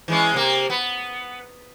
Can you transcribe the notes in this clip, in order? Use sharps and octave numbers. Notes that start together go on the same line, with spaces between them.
E3 G#3 C#4
C3 A#3
B3